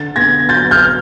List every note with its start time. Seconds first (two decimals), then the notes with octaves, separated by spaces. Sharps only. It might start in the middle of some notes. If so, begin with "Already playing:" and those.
Already playing: D3 A6
0.16 B3 G#6 A#6
0.49 F#3 G6 A6
0.71 F6 G6